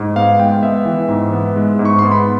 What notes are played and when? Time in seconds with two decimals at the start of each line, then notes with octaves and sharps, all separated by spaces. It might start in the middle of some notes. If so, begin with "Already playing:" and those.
Already playing: G#2
0.16 B3 F5
0.39 G#3 G5
0.63 B3 E5
0.85 E3
1.09 G#2
1.32 B3
1.56 G#3
1.79 G#2
1.85 C#6
1.99 B3 C6
2.12 B5